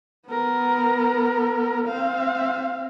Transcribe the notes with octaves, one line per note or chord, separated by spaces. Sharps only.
B3 A#4
C4 F5